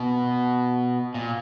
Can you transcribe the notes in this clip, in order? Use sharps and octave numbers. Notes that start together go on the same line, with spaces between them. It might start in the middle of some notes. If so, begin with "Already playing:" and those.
Already playing: B2
A#2